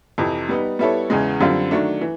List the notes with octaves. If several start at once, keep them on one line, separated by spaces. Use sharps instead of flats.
F2 C3 E3
G3 B3 D#4
G3 B3 E4 A4 C#5
E2 C#3 E3 G#3
F#2 D3 G3 C4 F4
D#3 F#3 A3 D4
E3